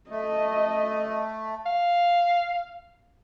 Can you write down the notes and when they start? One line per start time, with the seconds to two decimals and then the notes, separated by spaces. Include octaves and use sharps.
0.10 A3 D#5
1.66 F5